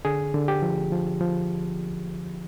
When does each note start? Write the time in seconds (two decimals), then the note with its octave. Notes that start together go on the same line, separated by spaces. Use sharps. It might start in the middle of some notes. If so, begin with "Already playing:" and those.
0.05 D3 G#4
0.34 D3
0.48 G4
0.62 F3
0.92 F3
1.21 F3